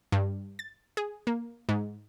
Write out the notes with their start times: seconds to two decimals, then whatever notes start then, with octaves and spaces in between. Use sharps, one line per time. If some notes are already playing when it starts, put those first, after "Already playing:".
0.12 G2
0.59 A6
0.97 G#4
1.27 A#3
1.69 G#2